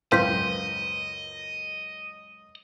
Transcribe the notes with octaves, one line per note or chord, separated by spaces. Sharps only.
C#2 F#2 B4 C5 D#5 F5 G5 C6